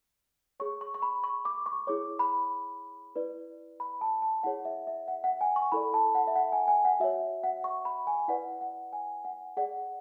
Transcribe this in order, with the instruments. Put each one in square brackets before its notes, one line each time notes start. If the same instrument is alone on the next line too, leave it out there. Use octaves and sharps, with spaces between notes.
[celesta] G#4 C#5 C#6
C#6
C#6
B5
C#6
D6
C#6
E4 G#4 C#5 D6
B5
E4 B4 D5
B5
A5
A5
E4 G#4 C#5 F#5
E5
E5
F#5
F#5
G#5
C#6
E4 A4 D5 B5
A5
F#5
E5
F#5
G#5
G#5
F#5
F#4 E5
C#5
F#5
C#6
B5
G#5
E4 B4 D5 F#5
F#5
G#5
F#5
G#4 D5 F#5